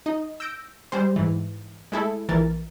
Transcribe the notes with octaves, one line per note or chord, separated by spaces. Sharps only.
D#4 D#5
E6 G6 A#6 D7
G3 G#3 C5
G#2 E3
G#3 A3 E4 G#4 A4
A#1 E3 A#4 A6